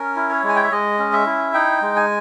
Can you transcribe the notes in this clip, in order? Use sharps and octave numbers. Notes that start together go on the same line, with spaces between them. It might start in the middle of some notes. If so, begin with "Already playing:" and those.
Already playing: C#4 A#4
E4
C#5
G#3
G#5
G5
E5
G#3 D#5
C#4
E5
E4
D#4 G5
G#3
G#5